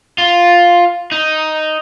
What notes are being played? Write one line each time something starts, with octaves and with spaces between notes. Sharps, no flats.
F4
D#4